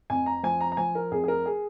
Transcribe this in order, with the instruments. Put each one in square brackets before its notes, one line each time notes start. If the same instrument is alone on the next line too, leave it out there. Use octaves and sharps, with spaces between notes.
[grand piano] F2 G#5
A#5
F3 G#5
A#5
A#5
F3 G#5
A#4
F2 G#4
G#4
A#4
G#4